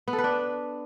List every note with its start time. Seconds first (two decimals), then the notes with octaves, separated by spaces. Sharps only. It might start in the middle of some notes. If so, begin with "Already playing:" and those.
0.08 B3
0.13 A4
0.18 B4
0.24 D4